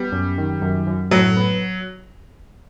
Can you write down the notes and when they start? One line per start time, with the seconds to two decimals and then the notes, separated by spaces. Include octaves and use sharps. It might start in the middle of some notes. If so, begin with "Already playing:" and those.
Already playing: G3 B3
0.12 F#2
0.38 D#3
0.62 F#2
0.87 F#2
1.11 A2 F#3
1.37 B3